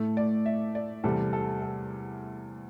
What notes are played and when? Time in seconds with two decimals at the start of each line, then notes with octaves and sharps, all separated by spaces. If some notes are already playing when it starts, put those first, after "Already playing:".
Already playing: A2 A3 A4
0.17 D5
0.46 E5
0.75 D5
1.04 E2 C3 G3 A4
1.33 A4
1.62 A4